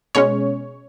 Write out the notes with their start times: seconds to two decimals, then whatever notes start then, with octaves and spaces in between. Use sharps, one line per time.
0.15 B2 G#3 C#4 C#5